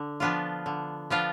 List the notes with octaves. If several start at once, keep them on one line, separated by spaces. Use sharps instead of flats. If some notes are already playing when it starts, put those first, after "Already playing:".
Already playing: D3
F3 B3 D4 F4
D3
F3 B3 D4 F4